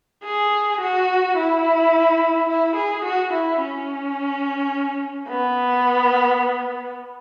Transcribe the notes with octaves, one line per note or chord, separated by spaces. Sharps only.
G#4
F#4
E4
E4
G#4
F#4
E4
C#4
B3